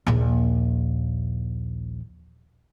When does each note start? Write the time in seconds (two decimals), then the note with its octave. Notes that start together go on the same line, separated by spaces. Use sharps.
0.07 A#1 D#2